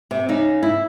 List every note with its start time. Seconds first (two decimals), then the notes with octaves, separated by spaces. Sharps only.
0.11 C3
0.29 C#3 D#4
0.63 E4